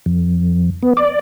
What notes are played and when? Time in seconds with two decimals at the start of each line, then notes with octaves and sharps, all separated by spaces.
0.06 F2
0.83 B3
0.97 D5